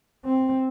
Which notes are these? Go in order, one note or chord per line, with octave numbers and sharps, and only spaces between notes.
C4